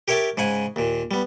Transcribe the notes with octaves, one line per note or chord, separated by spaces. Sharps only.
G4 A#4 C#5 E5 G5 A5
G#2 C#3 F#5 G#5
D#2 A#2
G3 B3